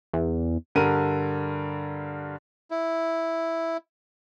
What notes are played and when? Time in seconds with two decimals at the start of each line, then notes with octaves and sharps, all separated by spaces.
0.13 E2
0.75 G2 D3 A#4 D#7
2.71 E4